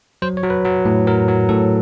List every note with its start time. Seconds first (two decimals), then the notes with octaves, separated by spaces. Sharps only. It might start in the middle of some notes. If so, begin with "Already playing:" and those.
0.22 F#3 C5
0.37 C#5
0.43 F#3
0.50 B4
0.65 F#3
0.85 A2
1.07 F#3 A#4
1.28 F#3
1.49 A2 A4